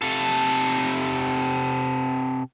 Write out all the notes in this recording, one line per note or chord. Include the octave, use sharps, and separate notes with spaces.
C3 A4